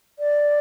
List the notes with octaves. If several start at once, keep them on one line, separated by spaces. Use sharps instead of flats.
D5